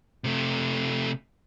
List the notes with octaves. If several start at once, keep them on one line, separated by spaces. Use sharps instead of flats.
C3 A3